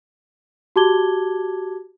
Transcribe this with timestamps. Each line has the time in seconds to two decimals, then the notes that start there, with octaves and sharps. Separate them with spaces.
0.76 F#4 G4 A5 D6 G#6 G7